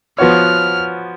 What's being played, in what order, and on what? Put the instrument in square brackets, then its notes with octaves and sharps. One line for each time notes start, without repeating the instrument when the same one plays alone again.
[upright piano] F3 B3 F#4 C#5 [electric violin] F6